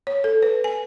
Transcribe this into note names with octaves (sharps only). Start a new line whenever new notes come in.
C#5
A4
B4
G#5